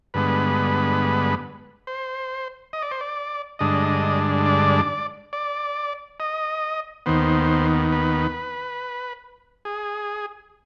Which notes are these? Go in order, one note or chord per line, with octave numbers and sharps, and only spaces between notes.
G2 D3 G#3 B3 B4
C5
D#5
D5
C5
D5
G2 D3 G#3 D4 D#5
D5
D5
D#5
D#2 D#3 B3 C5
B4
G#4